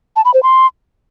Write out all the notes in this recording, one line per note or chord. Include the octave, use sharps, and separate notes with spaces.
A5
B5
C5
C6